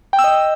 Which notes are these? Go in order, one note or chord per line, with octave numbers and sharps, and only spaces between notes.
G5
E6
D#5